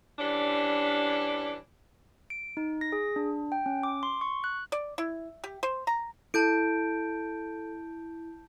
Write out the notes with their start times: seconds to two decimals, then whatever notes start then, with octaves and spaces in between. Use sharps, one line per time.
0.19 E3 G3 C#4 D4
2.30 D7
2.57 D#4
2.81 A#6
2.92 G#4
3.16 D4
3.52 G5
3.66 C#4
3.83 D6
4.03 C6
4.21 C#6
4.44 F#6
4.72 D5
4.98 E4
5.44 G4
5.63 C5
5.87 A#5
6.34 E4 A4 A5 G6 D7